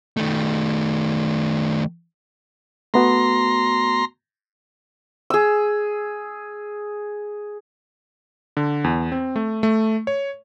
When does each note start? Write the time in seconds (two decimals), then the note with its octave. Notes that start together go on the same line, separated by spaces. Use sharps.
0.17 D#3 A3
2.94 A3 B3 F#4 A#5 C6
5.30 G#4 E6
8.57 D3
8.84 E2
9.12 C4
9.36 A3
9.63 A3
10.07 C#5